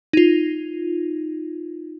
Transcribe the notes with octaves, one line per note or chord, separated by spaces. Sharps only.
D#4 F4